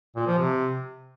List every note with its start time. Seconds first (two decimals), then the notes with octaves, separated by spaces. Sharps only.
0.16 A#2
0.27 F3
0.38 C3